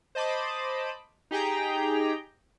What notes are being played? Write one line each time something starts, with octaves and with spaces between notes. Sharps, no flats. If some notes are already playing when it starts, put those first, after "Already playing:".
C5 D#5 A5 B5 D6
D#4 G4 G#4 G5 A#5